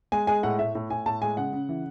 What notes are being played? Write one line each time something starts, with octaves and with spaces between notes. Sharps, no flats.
G#3 G#5
G#3 G#5
A2 F#5
A2 E5
A2
A2 G#5
A2 A5
G#3 G#5
C#3 F#5
C#3
E3